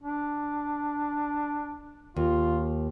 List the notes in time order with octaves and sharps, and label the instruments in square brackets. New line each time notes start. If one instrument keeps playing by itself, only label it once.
[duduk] D4
[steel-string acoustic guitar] D#2 [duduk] F4